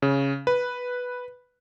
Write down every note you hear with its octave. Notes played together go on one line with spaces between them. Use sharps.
C#3
B4